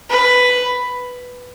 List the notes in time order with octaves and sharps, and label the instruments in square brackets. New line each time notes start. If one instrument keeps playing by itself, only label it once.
[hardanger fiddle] B4